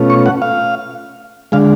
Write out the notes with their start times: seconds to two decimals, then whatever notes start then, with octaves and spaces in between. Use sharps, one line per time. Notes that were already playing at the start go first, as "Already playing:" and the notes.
Already playing: B2 A3 C#4 F4
0.10 C#6
0.26 F#5
0.42 F5
1.52 D3 G#3 F5